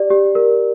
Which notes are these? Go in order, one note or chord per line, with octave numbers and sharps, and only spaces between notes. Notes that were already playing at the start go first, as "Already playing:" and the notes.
Already playing: G4 D5
G4
A#4